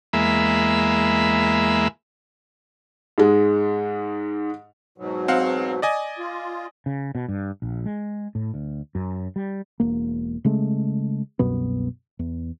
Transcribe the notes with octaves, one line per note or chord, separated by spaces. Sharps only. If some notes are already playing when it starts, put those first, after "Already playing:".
E2 G#3 A#3 E5 B5
G#2 G#3
G#2 B2 F#3
C4 F5 F#5
D5 D#5 G#5
F4
C#3
B2
G2
A#1
G#3
A2
D2
F#2
G3
E1 A#3
C#3 G#3 A3
C2 F#2 B2 B3
E2